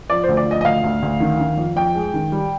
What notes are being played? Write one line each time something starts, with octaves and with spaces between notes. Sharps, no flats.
F3 D5
D2 C5
D5
F3 D#5
D#5
D2 F5
D2
D2
D#3
D#3
F2
F2 G5
G#3
D#3
G3